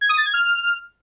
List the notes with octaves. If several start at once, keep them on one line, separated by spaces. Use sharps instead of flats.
G#6
D#6
A6
G#6
F6